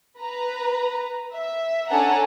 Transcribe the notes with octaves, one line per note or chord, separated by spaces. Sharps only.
B4 A#5
E5
C#4 D4 A4 F#5 G#5 A#5